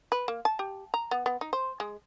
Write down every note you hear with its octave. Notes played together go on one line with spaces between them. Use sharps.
B4
A#3
A5
G4
A#5
B3
B3
D#4
C5
G#3